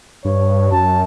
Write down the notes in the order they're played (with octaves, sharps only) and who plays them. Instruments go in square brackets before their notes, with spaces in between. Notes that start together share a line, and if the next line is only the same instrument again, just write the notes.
[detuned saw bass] G2 [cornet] C#5
[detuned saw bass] F#2 [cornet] A5